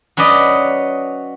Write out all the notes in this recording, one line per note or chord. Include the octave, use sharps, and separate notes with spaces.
F#3 C#4 B4 D5 D#5